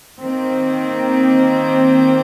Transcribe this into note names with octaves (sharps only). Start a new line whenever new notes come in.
D#3 A#3 C4